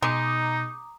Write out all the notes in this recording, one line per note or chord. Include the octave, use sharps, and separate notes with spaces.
B2 G#3 D#4 A#5 D6 D#6